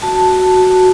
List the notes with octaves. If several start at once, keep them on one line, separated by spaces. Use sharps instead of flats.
F#4 A5
F#4
F#4